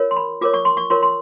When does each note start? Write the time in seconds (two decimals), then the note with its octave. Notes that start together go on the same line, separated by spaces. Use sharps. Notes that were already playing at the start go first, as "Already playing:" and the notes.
Already playing: F4 A#4 C#5
0.11 C6
0.17 B5
0.41 F4 A#4 C#5 D6
0.54 C#6
0.65 C6
0.77 C#6
0.90 F4 A#4 C#5 C6
1.03 C6